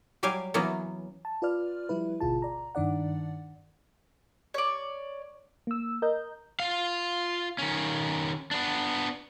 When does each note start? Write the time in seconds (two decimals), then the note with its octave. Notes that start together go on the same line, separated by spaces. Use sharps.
0.23 F#3 G3 G4 F5 G#5
0.54 E3 F#3 A#3 B3 C#4
1.25 A5
1.42 F4 B4 D5 F6
1.89 F3 G3 E4 B4
2.20 G#1 D2 B2 F4 G#4 A5
2.42 D5 A#5
2.75 G2 D#3 D4 D5 F#5
4.54 C#5 D5
5.67 A#3 E6
6.02 A#4 D#5 G6
6.60 F4 F5
7.59 D#3 C#4
8.51 B3 D4